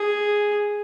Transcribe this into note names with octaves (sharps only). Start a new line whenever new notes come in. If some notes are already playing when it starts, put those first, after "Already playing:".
Already playing: G#4